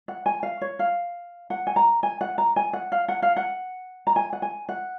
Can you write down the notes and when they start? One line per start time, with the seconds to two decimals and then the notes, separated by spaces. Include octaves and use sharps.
0.08 F#5
0.26 G#5
0.43 F5
0.61 C#5
0.79 F5
1.50 F#5
1.67 G#5
1.76 A#5
2.03 G#5
2.21 F#5
2.38 A#5
2.56 G#5
2.73 F#5
2.92 F5
3.08 F#5
3.22 F5
3.36 F#5
4.07 A#5
4.16 G#5
4.33 F#5
4.42 G#5
4.69 F#5